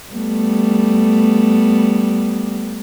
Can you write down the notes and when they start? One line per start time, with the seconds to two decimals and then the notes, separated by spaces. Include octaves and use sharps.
0.12 G3 A3 B3